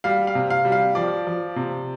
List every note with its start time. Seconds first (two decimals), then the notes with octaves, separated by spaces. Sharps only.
0.04 G3 F5
0.27 F5
0.35 C3
0.50 F5
0.65 G3
0.72 F5
0.95 F3 D5
1.27 F3
1.56 C3